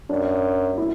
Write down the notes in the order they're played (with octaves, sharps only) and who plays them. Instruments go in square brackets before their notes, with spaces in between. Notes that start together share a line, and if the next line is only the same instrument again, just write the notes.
[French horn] F#2 [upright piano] D4
[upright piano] E4